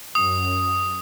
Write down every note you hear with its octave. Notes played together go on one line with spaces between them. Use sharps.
F#2 D#6